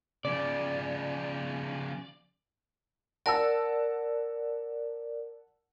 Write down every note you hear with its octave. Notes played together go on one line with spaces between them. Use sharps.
C#3 F3 D5
A#4 D5 F#5 A5 E6